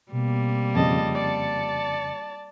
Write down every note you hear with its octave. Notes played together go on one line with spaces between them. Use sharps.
B2 G3 A#3 C4
F2 C#3 D#5 A5
D5 A5 C#7